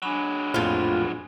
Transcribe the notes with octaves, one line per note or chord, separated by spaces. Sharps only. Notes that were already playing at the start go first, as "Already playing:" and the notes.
F#3 G#3 D4 G#5 B5
A#1 F2 A2 F4